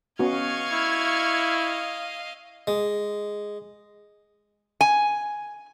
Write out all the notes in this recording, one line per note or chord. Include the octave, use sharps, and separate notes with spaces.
B3 C#4 F#4 D#5 F5 C#6 F6 G#6
E4
G#3
G#5